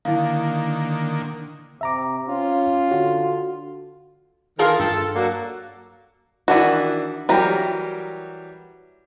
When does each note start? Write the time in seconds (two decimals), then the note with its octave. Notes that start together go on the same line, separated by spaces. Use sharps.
0.05 D3 D#3 A#3 E4 F5
1.81 C3 E5 A#5 D6
2.28 C#4 F4
2.91 D3 F#4
4.59 D#3 E3 F4 G#4 A#4 F5 A5
4.80 G2 A4
5.16 F#3 A#3 D4 F#4
6.48 D#3 E3 D4 E4 F#4
7.29 E3 F#3 G3 G4 A#4 A#5